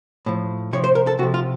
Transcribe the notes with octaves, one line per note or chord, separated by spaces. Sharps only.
A2 F3
C3 F3 C#5
C5
A#4
A4
C3 F3 F#4
F4